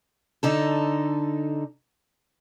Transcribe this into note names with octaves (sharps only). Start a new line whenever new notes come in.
D3 D#4 A4